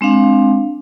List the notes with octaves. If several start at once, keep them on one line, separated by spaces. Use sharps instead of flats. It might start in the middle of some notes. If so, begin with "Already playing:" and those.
G#3 C4 D4 F5